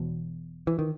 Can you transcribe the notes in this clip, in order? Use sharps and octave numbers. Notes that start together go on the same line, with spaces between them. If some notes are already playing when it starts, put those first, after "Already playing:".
Already playing: E1 E2 B2
E3
D#3